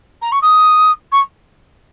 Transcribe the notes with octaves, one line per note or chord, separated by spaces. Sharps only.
A#5
C#6
D#6
C#6